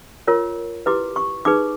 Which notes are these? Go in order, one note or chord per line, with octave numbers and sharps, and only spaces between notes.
F4 A#4 C#5
E4 G4 B4 D6
C#6
D#4 G#4 B4 D6